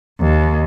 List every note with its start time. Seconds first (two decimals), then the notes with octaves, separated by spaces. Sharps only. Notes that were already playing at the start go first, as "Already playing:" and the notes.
0.20 D#2